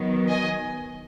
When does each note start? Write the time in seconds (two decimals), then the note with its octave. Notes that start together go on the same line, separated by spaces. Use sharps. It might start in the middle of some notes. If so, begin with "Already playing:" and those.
Already playing: D#3 F#3 B3
0.29 D#5 G#5